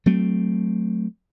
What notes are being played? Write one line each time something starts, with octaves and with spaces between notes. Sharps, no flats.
F#3 A3 C4